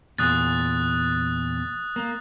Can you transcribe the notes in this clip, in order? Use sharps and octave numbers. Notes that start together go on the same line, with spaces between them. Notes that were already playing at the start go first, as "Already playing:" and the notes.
E2 A#2 D#6 F#6 A6
A#3